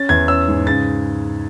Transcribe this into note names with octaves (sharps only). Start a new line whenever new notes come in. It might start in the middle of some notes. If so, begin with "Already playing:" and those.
Already playing: C#4 A6
E2 G#6
C#4 E6
G#2
C#3 A6